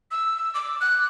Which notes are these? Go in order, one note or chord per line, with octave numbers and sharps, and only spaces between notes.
E6
D6
F#6